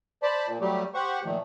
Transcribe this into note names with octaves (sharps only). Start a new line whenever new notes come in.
C5 D5 A5 B5
A#2
F#3 G3 A3 G4
G4 C5 F#5 C#6
A#2 D#3 F3 A3